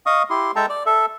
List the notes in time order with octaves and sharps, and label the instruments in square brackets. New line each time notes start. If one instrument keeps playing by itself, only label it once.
[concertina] D#5 F5 C#6 D#6
E4 G4 C6
G#3 A4 E5 G5 A5 A#5
D5
A4 E5